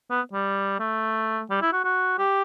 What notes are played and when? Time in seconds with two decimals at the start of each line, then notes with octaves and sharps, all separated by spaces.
0.11 B3
0.33 G3
0.80 A3
1.50 G3
1.62 E4
1.73 F#4
1.84 F#4
2.19 G4